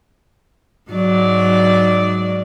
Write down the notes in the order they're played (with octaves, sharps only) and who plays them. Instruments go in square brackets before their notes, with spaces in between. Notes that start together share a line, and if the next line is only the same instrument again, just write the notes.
[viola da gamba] G#2 F#3 D5